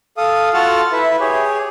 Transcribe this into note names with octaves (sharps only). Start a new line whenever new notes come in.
A4 F5 D#6
F4 F#4 A4 F#5 A5 F6
E4 B4 E5
G4 G#4 C#5